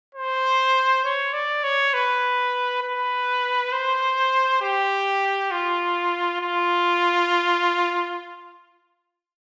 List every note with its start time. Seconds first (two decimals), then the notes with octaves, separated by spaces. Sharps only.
0.15 C5
1.05 C#5
1.34 D5
1.64 C#5
1.94 B4
2.83 B4
3.72 C5
4.62 G4
5.51 F4
6.41 F4